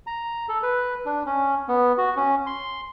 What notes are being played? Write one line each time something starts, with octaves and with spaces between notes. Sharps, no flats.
A#5
A4
B4
D4
C#4
B3
F#4
C#4
C6